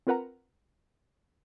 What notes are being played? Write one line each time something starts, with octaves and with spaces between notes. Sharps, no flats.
C4 F4 A#4 B4 F#5 A#5